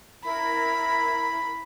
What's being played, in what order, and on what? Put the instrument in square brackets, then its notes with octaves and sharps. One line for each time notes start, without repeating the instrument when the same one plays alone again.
[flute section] E4 A#4 [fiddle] B5